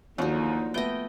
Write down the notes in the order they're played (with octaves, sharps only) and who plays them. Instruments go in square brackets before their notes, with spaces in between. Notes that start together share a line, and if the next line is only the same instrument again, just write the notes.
[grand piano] D#2 [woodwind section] D3 D#4 [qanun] F3 F#3 [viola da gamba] A#3
[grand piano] A3 B3 [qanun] D#5 G5